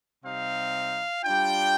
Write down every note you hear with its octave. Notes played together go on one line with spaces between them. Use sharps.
C3 G3 C4 D#4 F5
G3 D4 F4 G5